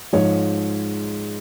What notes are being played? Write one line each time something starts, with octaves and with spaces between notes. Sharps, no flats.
G#2 F3 G#3 C#5